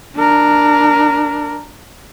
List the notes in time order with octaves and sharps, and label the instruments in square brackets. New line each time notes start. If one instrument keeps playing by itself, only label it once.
[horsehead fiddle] D4 A#4